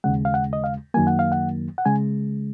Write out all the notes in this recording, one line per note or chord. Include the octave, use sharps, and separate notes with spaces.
D#2 C#3 G#3 F#5
F5
F#5
D#5
F5
F#2 D#3 F#3 A#3 G#5
F#5
F5
F#5
F#5
C#3 G#3 G#5